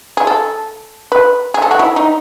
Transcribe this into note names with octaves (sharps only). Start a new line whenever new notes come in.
G#4
A4
B4
G#4
A4
F#4
E4
D#4